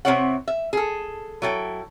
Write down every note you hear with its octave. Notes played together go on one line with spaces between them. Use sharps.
C3 B3 C4 E4 C#5 F#5
E5
G#4 A4
F#3 E4 A4 G5